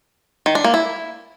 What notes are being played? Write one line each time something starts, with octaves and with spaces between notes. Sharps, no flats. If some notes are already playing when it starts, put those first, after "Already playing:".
D#3
D4
A#3
E4